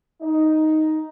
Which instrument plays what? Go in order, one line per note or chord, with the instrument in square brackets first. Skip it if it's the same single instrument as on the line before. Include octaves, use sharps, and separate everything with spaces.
[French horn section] D#4